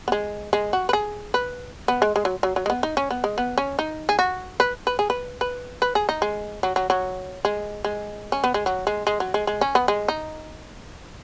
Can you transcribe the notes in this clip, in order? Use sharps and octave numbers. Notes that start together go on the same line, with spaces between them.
B3
G#3
G#3
F#4
B4
G#4
B4
B3
G#3
G#3
F#3
F#3
F#3
G#3
B3
D#4
C#4
B3
G#3
B3
C#4
D#4
G#4
F#4
B4
B4
G#4
B4
B4
B4
G#4
D#4
G#3
F#3
F#3
F#3
G#3
G#3
C#4
B3
G#3
F#3
G#3
G#3
F#3
G#3
G#3
C#4
B3
G#3
D#4